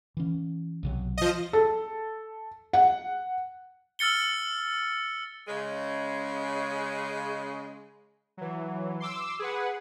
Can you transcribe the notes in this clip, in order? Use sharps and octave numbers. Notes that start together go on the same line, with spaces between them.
E3 C#4
B1 C3 F#3
F3 D#5
A4
F#5
E6 F6 A6 C#7 G7
C#3 G#3
E3 F#3
C6 D6 E6
G#4 B4 F#5